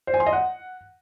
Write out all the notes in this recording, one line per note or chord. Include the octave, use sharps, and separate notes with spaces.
C5
G#5
C6
D#5
F#5